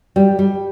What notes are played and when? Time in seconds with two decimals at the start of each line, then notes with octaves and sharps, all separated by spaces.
0.16 G3
0.39 G3